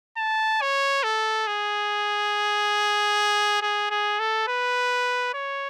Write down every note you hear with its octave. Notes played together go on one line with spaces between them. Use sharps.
A5
C#5
A4
G#4
G#4
G#4
A4
B4
C#5